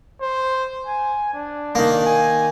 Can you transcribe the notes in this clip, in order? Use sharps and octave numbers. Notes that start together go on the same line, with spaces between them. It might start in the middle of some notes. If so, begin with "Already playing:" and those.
C5
G#5
D4
D#3 A#3
G#5